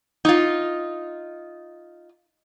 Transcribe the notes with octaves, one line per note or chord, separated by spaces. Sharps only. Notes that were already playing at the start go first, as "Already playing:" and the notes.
D#4 F4